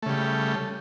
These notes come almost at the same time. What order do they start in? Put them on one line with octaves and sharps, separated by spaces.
A3 C#3 G3